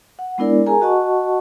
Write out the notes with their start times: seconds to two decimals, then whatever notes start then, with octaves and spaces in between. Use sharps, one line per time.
0.19 F#5
0.38 G#3 B3 D4 E4 A#4 D5
0.67 G#4 A#4 G#5 A#5
0.81 F#4 D#5 F#5 A5 C#6